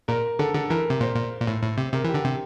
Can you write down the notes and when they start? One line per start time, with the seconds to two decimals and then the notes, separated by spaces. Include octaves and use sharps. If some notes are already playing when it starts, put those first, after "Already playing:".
0.08 A#2 A#4
0.39 D3 A4
0.55 D3 A4
0.70 E3 A#4
0.90 C3
1.00 A#2 C5
1.16 A#2
1.40 A#2
1.47 A2
1.62 A2
1.78 C3
1.93 C3 A#4
2.04 E3
2.09 G4
2.14 D3
2.25 C3